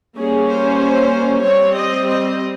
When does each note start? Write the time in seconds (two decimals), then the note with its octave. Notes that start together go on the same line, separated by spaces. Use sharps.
0.19 G3 A#3 C#4 G#4
0.50 C5
1.44 G3 C4 C#5
1.76 D#5
2.08 D#5